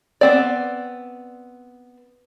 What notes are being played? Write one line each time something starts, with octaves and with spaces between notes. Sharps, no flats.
B3 C4 D5